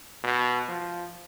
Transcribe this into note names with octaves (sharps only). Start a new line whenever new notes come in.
B2
F3